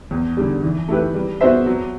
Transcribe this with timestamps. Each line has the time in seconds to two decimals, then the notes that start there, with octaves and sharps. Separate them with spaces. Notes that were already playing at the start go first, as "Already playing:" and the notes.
0.11 E2
0.37 D3 G3
0.63 E3
0.88 A3 E4 G4 B4
1.14 G3
1.41 B3 F#4 C5 E5
1.66 F#3